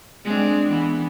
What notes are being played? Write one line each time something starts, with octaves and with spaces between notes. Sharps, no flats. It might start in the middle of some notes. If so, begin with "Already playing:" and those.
G#3 C4 D4
E3 B3